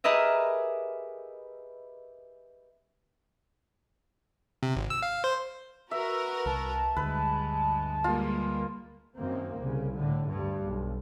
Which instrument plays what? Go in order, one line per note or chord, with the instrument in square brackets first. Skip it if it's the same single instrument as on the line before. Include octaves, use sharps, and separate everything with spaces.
[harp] G4 G#4 A#4 B4 D#5 E5
[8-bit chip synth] C3
G#1
E6
F5
C5
[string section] F#4 A#4 B4 [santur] E5
[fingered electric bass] C2 [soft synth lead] A5
[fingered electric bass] D2 [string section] G2 G#3 [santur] B4
[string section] G3 G#3 A#3 [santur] F4
[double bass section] F#2 D#3 A#3 C4
C2 C#3
A2 D3
D2 G2
B1